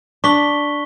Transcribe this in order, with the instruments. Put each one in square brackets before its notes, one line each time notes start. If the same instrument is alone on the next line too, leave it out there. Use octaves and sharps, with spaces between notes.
[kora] D4 [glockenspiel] C#6 B6 G7